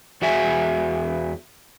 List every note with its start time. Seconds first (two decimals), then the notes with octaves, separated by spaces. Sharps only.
0.22 E2 B3 F#4 G#4 E5 G#5